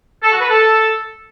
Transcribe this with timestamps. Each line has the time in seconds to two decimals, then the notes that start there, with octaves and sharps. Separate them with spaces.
0.23 A4
0.31 F#4
0.40 B4
0.49 A4